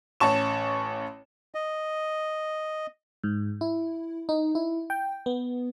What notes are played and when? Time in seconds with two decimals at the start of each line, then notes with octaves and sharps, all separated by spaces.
0.20 A1 C#4 A5 C#6 E7
1.55 D#5
3.24 G#2
3.61 E4
4.29 D#4
4.55 E4
4.90 G5
5.26 B3